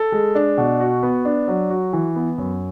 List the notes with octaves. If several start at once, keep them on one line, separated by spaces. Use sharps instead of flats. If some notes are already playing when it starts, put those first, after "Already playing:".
Already playing: A4
G#3
D4
B2
F#4
B3
D4
F#3
F#4
E3
B3
F#2